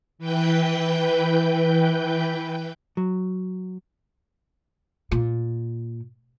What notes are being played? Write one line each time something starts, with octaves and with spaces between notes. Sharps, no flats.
E3 B4 G5 G6
F#3
A#2